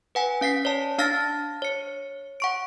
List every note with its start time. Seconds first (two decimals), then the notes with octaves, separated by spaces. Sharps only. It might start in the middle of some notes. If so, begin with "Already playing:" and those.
0.15 B4 F#5 G#5
0.41 C#4 F5 B6 C7
0.65 C#5 D5 A5
0.98 D4 F5 A5 F6 A6 A#6
1.62 C#5 C#7
2.40 F#5 C#6 D7